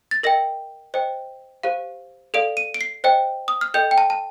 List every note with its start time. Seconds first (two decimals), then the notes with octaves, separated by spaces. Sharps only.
0.11 A6
0.23 A#4 D#5 G5 A#6
0.94 C5 D#5 G5
1.63 G4 C5 F5
2.34 A4 D5 F5 D7
2.57 D#7
2.74 D7
2.81 C7
3.04 C5 D#5 G5
3.48 D#6
3.61 F6
3.74 A4 D#5 G5 G6
3.91 G5
3.98 A5
4.10 A5